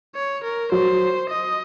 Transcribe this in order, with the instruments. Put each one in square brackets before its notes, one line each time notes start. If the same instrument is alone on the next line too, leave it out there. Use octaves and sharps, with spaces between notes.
[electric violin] C#5
A#4
[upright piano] F#3 F#4 [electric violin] C5
[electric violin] D#5